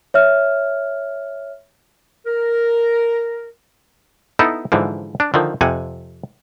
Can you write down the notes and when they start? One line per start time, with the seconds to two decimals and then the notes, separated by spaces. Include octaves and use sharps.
0.14 C#5 E5 F6
2.26 A#4
4.39 B3 D#4 E4 A4
4.72 G#2 D3 E3 F3
5.20 D4
5.34 D3 D#3 F3
5.61 F2 C3 F#5 G#5